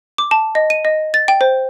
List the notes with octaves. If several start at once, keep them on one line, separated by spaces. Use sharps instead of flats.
D6
A5
D#5
D#7
D#5
A6
G5
C5